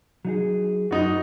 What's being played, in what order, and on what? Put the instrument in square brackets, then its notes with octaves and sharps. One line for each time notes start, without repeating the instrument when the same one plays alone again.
[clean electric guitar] F#3 D#4 G#4
[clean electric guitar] F#2 [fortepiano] D#4 F#4